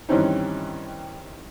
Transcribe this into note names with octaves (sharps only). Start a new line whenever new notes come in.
G2 D#3 E3 C4 C#4 D#4